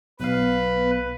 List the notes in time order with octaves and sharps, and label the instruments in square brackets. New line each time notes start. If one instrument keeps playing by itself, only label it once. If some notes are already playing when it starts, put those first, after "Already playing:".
[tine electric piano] B1 F5 [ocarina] B3 [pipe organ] B4